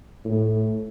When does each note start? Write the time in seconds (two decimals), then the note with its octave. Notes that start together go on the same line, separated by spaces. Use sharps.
0.25 A2